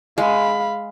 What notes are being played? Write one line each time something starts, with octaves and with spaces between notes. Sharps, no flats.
G#3 F5 B5